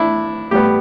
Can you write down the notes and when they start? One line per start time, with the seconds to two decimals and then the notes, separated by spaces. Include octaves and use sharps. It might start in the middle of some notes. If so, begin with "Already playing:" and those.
Already playing: A2 D4 E4
0.51 A2 G3 B3 G4